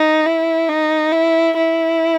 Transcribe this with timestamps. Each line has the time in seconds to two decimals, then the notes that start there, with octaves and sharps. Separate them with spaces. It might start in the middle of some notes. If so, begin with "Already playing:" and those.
Already playing: D#4
0.25 E4
0.68 D#4
1.12 E4
1.56 E4